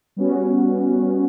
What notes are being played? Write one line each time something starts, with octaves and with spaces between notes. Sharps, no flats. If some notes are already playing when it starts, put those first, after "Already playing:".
G3 B3 C#4 F#4